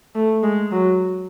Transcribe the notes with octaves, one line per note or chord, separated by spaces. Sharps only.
A3
G#3
F#3